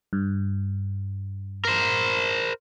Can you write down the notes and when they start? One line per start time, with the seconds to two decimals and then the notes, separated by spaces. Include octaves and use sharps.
0.13 G2
1.65 A#4 C5